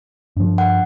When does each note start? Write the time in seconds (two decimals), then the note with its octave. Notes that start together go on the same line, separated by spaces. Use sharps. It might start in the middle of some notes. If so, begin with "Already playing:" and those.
0.37 G2 F3
0.58 F#5